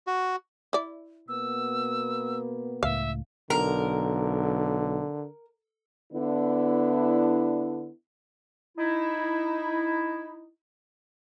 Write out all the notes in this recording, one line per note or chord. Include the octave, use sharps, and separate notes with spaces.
F#4
E4 D5
B2 A#3 B3 E6
C#2 A2 E5 F5
B1 D3 A#4
D3 B3 D4 E4
D#4 E4